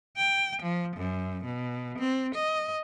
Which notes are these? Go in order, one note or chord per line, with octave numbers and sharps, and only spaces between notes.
G5
F3
F#2
B2
C4
D#5